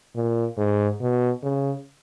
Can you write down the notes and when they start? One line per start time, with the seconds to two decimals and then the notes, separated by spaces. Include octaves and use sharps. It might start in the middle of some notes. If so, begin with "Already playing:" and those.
0.16 A#2
0.58 G#2
1.01 B2
1.43 C#3